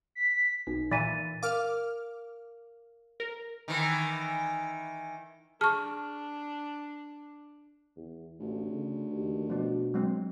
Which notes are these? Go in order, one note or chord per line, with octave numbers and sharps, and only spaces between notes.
B6
B1 D#4
A#2 E3 A6 B6 D#7
A#4 F5 D6 F6
A#4
D#3 E3
D4 G#4 A5 C#6 F6
E2
A1 D2
C#3
D#2
B2 F3 D4
F#3 G#3 C4